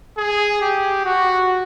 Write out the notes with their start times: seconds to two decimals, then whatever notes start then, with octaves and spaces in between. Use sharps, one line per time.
0.18 G#4
0.62 G4
1.05 F#4